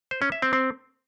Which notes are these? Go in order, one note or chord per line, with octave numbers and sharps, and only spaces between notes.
C5
C#4
E5
C4
C4